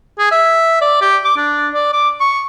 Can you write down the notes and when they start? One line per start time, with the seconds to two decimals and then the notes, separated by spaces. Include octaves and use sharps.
0.18 G#4
0.32 E5
0.81 D5
1.01 G4
1.25 D6
1.37 D4
1.73 D5
1.93 D6
2.20 C#6